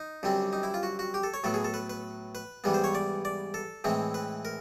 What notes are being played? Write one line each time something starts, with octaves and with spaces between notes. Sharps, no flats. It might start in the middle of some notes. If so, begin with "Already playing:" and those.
Already playing: D#4
F#2 D3 G3 C4
D#4
E4
F4
F#4
F#4
G4
A4
C#5
A2 F#3 B3 A4
G#4
A4
B4
B4
B4
G#2 E3 G3 B3
C5
C#5
D5
D5
A4
A2 E3 G#3 C4
B4
A#4